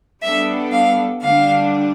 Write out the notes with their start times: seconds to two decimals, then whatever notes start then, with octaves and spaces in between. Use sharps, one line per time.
0.22 G3 B3 D4 A4 E5
0.72 F5
1.22 D3 G3 D4 F5